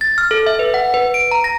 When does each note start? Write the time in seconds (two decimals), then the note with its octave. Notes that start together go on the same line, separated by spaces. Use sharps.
0.01 A6
0.18 F6
0.31 A4
0.46 E5
0.59 B4
0.74 F#5
0.94 B4
1.14 D7
1.31 A#5
1.44 A#6